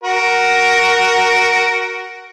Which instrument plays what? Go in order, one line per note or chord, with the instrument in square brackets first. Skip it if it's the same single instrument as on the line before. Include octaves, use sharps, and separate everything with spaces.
[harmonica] F#4 A#4